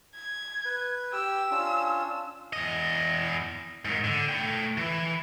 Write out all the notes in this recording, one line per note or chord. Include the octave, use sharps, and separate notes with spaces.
G#6
B4
G4 G5 E6
C#4 D4 F4
E2 D#5
G#2 D#3
D3
A3 G5
E3